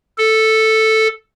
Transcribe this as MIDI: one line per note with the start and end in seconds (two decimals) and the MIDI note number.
0.18 1.08 69